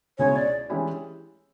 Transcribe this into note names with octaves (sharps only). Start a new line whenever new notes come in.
C#2 B2 G#3 C#4 E4 C#5
D5
E3 G#3 C#4 E4 G4